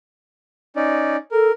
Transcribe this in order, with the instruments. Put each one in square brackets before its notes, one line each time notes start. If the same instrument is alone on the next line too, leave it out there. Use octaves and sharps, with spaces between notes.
[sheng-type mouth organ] C#4 D#4 D5
[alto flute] A4 [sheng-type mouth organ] A#4